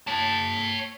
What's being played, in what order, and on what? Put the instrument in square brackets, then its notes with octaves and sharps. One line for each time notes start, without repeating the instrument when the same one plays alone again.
[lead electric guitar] C#5 A5